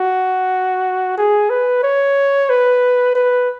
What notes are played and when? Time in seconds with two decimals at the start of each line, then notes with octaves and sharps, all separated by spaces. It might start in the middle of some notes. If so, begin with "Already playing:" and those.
Already playing: F#4
1.17 G#4
1.50 B4
1.83 C#5
2.49 B4
3.15 B4